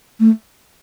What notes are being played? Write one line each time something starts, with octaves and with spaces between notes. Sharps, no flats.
A3